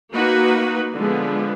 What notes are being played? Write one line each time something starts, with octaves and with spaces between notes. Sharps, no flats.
A#3 D#4 F#4 B4
D3 F3 G#3 B3